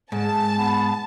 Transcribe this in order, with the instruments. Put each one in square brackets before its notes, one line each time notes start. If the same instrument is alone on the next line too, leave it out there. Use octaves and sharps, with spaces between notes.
[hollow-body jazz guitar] G#2 [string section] A5
[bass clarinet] B3